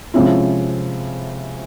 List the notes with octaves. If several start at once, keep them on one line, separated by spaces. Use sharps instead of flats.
C3 F3 G#3 C#4 E4